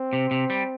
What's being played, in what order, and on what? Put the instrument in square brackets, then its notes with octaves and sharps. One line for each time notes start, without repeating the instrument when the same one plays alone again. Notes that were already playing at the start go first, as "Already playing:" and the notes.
Already playing: [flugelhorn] C4
[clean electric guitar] C3
C3
G3